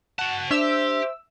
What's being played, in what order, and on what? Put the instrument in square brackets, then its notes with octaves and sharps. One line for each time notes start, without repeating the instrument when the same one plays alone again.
[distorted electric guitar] F#4 A5 [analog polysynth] F#5
[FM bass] D4 [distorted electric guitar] G4 [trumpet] C5 [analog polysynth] E5 E6